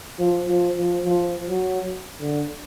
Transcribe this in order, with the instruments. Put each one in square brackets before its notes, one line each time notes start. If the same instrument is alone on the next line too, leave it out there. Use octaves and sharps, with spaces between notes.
[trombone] F3
F3
F3
F3
F#3
D3